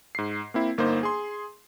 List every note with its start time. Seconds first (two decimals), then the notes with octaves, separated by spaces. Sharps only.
0.15 G#2 C7
0.54 A#3 C4 E4
0.78 G1 A#3 D#4 C5
1.03 G#4 C6